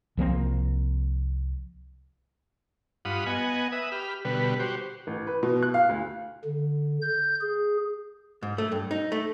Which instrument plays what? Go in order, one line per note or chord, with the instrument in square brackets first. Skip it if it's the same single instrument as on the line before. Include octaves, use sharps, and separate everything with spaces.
[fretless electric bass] C2 F3 A#3 C4
[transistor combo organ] G2 F4 F#5 B5 D#6
B3 D#5 F#5 G#5
B4 E5 D#6
G4 B5 F6
B2 D3 G3 B4
F#4 G4 C5
[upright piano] A1
B4
B2
F#6
F5
D2
[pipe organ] D3
G6
G#4
[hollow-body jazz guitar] G#2
A3
G2
D#4
A3